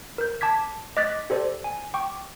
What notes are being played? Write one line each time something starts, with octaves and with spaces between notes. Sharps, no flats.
A#4 G6
A5 D6 G#6 B6
D#5 D6 F#6 A6 B6
G4 A4 C5 D5
G#5
G5 C#6 D6